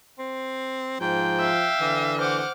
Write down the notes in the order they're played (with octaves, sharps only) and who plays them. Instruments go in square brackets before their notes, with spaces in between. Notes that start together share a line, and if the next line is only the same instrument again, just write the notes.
[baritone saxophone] C4
[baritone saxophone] G#2 [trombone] F3 [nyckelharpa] G5
[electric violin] E5 F5
[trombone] D3 [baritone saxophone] E3
[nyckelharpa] C5 F#5 [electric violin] D6 F6